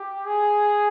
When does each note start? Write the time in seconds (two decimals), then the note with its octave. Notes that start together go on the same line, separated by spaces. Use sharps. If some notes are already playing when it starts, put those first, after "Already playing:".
Already playing: G4
0.26 G#4